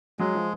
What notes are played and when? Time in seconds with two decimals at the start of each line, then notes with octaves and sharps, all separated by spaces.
0.19 F#3 G#3
0.35 F3